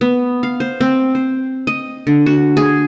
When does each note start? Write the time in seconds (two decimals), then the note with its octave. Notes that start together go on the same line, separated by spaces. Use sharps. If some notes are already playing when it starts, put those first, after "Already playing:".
0.01 B3
0.43 F5
0.60 C5
0.81 C4
1.15 C5
1.67 D#5
2.07 D3
2.26 F#4
2.57 G#4